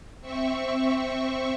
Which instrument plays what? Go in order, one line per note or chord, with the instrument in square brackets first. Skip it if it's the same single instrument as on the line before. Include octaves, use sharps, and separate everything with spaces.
[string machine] C4 E5 C#6